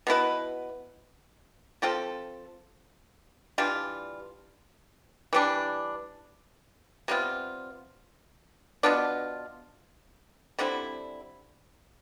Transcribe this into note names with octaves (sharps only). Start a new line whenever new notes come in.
B2 B3 E4 B4
F3 C4 F4 A4
E3 G3 D4 F4
E3 G3 D4
C3 G3 B3 F4
B2 B3 D4 F4
D3 G3 C4 E4